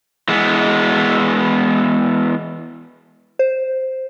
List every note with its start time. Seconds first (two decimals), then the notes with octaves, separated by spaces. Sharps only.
0.28 E3 G#3 B3
3.39 C5